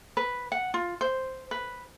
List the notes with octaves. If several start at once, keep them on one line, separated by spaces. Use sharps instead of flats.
B4
F#5
F4
C5
B4